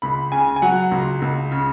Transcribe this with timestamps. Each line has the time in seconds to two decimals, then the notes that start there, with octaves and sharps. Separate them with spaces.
0.02 C#2 B5
0.32 C#3 G#5
0.56 G#5
0.62 F#3 F#5
0.92 C#2
1.22 C#2
1.51 C#3